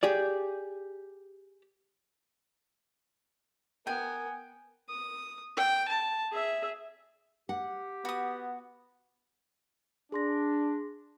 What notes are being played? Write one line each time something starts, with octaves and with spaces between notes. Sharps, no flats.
G4 G#4 D5
B3 A#4 G5 G#5
D#6
G5
A5
G#4 E5
G4 F#5
B3 F#4 D#6
D4 G#4 C6 A#6